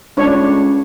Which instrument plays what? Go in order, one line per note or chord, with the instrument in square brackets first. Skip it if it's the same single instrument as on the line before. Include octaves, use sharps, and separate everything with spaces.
[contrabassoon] C#2 [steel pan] D4 C#5